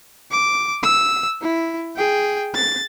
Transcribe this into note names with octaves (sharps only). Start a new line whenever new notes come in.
D6
E6
E4
G#4 G5
A6